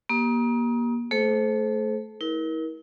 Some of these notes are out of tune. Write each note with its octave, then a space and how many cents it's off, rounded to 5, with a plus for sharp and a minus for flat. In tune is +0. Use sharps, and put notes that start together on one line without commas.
A#3 +30 G4 +0 D#6 +25
A3 +0 A4 -40 C5 +0
E4 -40 A#4 +30